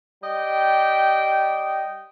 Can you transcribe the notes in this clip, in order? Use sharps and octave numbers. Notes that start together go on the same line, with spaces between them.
G3 D#5 G5